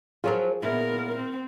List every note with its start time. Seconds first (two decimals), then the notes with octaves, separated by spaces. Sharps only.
0.24 F3 F#3 F4 G#4 A#4 C#5
0.62 A#2 B3 E4 A#4
1.15 C4